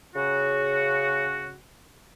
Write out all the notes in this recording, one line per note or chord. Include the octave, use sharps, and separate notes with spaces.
C#3 F#4